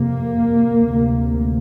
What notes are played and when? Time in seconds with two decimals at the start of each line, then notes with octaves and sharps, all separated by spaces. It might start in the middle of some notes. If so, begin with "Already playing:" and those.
Already playing: F2 C3 A#3
0.78 D2 C3